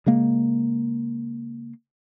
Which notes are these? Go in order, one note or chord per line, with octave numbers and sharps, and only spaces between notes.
C#3 G#3 A#3